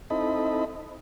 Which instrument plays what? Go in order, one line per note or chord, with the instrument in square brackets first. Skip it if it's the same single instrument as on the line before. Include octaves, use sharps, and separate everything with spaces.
[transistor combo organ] C4 D#4 E4 A4 D#5 B5